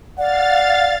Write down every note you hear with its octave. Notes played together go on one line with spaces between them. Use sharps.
D5 F5 F#5 A6